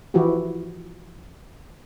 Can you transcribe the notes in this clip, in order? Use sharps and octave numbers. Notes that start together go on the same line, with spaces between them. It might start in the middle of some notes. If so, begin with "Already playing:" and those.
E3 F3 E4 F#4 G4